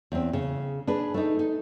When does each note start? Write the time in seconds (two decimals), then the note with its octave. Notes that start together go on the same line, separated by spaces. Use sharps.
0.12 E2 C4
0.33 C#3
0.87 D4 G#4 B4
1.14 A3 D#4
1.39 D#4